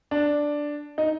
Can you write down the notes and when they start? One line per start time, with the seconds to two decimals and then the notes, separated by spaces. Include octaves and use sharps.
0.11 D4
0.98 D#4